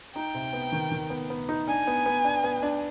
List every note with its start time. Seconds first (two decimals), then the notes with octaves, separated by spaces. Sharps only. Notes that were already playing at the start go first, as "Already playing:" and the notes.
0.16 D#4 G5
0.34 C3
0.53 B3
0.72 D#3
0.92 D#3
1.10 B3
1.30 B3
1.49 D#4
1.68 D4 G#5
1.87 B3
2.06 B3
2.25 D4
2.44 B3
2.63 D4